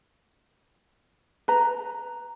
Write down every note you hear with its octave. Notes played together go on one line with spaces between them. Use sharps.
B4 A#5